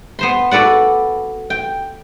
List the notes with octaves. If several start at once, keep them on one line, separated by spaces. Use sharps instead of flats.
B3 C5 C6
F#4 A4 B4 D5 F#5
G5